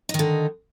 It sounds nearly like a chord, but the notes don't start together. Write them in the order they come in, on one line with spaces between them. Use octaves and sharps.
D#4 D#3 D3